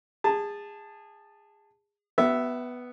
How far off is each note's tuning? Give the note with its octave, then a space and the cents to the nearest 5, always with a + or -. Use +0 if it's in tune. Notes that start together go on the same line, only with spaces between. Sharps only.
G#4 -25 A5 +0
B3 +0 F#4 +45 E5 +0